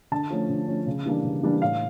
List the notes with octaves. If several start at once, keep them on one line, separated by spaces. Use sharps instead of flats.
D3 A5
F3 A3 C#4
D3
F3 A3 C#4
C#3
E3 G3 A#3 D4
C#3
E3 G3 A#3 D4
A2 F5